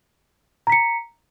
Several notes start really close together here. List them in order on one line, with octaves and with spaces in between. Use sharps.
A#5 B6 C#7